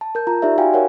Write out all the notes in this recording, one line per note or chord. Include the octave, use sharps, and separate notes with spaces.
A5
A#4 G6
F4 A#5
D#4 G4 D5 E5
F#4 F5 G5 G#5
A#4 C#5 F#5